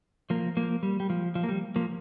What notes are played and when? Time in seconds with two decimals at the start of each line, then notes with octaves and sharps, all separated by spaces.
0.30 F3 A#3
0.57 F3 A#3
0.83 G3
1.00 G3
1.10 F3
1.35 F3
1.43 A#3
1.49 G3
1.76 F3 A#3